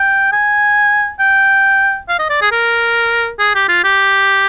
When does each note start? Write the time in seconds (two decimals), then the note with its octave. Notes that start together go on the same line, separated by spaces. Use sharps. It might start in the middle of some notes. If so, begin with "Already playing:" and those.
Already playing: G5
0.32 G#5
1.20 G5
2.09 F5
2.19 D#5
2.29 D5
2.41 G#4
2.52 A#4
3.39 G#4
3.55 G4
3.68 F4
3.84 G4